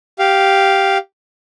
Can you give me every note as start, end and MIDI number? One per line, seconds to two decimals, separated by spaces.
0.19 0.98 67
0.19 0.98 77